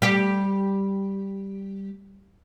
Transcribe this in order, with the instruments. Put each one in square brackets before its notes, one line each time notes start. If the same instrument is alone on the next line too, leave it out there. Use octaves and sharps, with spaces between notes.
[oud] G3 G4